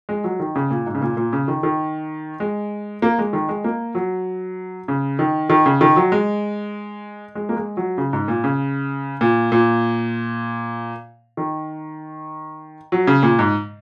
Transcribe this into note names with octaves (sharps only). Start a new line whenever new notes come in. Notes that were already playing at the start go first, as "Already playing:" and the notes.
G#3
F#3
D#3
C#3
A#2
G#2
C#3
A#2
A#2
C#3
D#3
D#3
G#3
A#3
G#3
D#3
G#3
A#3
F#3
C#3
D#3
D#3
C#3
D#3
F#3
G#3
G#3
A#3
G#3
F#3
C#3
G#2
A#2
C#3
A#2
A#2
D#3
F#3
C#3
A#2
G#2